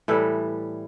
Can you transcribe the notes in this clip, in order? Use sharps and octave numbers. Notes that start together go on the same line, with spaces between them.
A2 E3 G3 A4